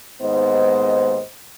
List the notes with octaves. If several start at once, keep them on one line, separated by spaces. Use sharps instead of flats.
D#2 G#2 B3 C5 D#5